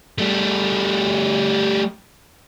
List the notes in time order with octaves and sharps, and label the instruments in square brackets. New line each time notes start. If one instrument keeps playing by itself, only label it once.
[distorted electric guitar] G3 A3